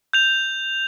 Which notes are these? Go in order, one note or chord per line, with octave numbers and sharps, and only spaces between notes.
G6 F7